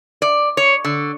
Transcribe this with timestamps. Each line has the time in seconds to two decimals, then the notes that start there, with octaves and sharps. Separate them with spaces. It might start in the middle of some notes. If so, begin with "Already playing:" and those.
0.22 D5
0.57 C#5
0.85 D3